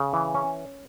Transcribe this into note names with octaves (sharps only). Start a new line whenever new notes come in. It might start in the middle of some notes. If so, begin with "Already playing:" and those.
Already playing: C#3
E3
C#4